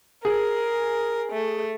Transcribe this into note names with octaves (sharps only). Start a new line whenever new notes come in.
G#4 A#4
A3